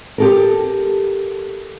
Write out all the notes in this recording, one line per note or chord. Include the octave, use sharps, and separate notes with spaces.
G4 A4 A#4